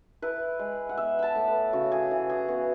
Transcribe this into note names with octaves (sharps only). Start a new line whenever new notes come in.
E4 B4
G#3
F#5
B3 E5
A5 B5
A2
B4
C#3 F#4
G#4
E3
G#4
B3 F#4